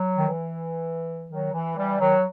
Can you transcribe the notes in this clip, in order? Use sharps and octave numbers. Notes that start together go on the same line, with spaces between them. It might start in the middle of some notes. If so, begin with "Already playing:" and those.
Already playing: F#3
D#3
E3
D#3 F#3
E3
E3 G3
D#3 F#3